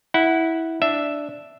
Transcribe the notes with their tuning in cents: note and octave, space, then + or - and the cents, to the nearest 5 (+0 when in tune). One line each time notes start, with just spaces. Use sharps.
E4 -15 F#5 +0
D4 +0 E5 +0